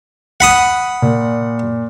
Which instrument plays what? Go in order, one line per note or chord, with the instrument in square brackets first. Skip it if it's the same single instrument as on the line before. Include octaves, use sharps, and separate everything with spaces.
[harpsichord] F#5 B5 D#6
[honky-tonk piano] A#2